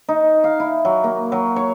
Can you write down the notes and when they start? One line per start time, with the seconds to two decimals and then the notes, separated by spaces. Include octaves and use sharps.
0.09 D#4
0.44 F5
0.60 E4
0.85 F#3
1.04 A#3
1.32 F#3
1.56 C#5